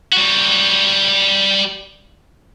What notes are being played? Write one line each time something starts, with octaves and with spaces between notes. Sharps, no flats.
G3 F#4